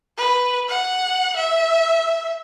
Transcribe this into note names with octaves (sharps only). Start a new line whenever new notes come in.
B4
F#5
E5